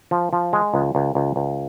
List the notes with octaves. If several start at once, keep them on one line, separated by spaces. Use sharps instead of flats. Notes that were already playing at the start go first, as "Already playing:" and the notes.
F3
F3
G#3
C#2
C#2
C#2
C#2